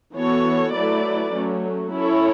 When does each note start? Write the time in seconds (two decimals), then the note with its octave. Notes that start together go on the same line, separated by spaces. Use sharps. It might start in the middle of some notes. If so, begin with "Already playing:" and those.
0.15 E3 B3 F#4 A4 C#5
0.75 F#3 A3 E4 B4 D5
1.34 F#3 A3 C#4
1.94 C#4 E4 A4 C#5